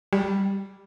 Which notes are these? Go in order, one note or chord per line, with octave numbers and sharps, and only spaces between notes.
G3